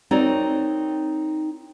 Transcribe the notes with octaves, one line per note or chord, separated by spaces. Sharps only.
C4 D#4 F#4 A#4 C#5 D5